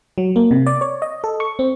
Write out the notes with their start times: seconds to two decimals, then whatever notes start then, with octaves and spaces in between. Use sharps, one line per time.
0.18 F#3
0.36 A#3
0.51 C3
0.67 D5
0.81 C#5
1.02 D#5
1.24 A4
1.40 C#6
1.59 C4